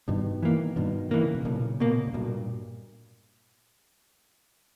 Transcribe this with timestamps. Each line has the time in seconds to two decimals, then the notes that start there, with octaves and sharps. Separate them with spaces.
0.08 G2 B2 D#3
0.43 E3 A#3
0.76 G2 B2 D#3
1.11 D#3 E3 A#3
1.22 C#3
1.35 B2
1.45 B1 A#2 C#3
1.80 B2 A#3
2.08 G#2
2.14 B1 G2 A#2